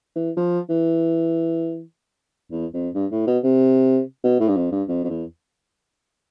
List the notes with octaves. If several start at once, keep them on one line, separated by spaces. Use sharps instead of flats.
E3
F3
E3
E2
F2
G2
A2
B2
C3
B2
A2
G2
F2
G2
F2
F2
E2